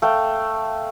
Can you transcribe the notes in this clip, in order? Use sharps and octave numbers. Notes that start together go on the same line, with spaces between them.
A3 F5 G5